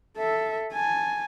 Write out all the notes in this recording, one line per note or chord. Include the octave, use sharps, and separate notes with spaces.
A4 E5
G#5 A5